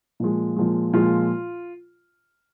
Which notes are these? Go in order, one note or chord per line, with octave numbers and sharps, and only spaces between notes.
A#2 F3 G#3
A#2 F3 G#3
A#2 F3 G#3 F4